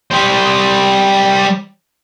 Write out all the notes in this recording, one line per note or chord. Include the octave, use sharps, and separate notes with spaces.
G3 C5